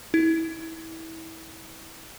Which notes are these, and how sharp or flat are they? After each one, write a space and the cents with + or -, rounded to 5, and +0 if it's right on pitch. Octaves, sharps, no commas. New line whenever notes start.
E4 -25